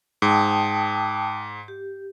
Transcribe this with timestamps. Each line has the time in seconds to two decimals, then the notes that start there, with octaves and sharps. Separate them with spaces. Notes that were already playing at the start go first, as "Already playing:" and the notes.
0.22 G#2 G5 A5 D#6
1.68 G4